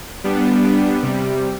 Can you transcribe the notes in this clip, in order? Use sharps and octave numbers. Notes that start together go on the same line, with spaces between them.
G3 B3 D4
C3 G3